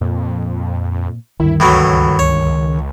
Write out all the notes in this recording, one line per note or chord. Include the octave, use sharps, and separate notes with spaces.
F2 A#2
D2 G2 D#3 E4
C#2 A2 E3 F#3
C#2 C#5